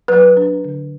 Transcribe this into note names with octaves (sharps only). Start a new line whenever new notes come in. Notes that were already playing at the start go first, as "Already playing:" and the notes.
F#3 B4
D4
D3